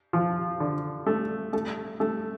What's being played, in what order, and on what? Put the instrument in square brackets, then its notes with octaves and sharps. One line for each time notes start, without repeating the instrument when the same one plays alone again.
[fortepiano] F3
D3
A3
A3
A3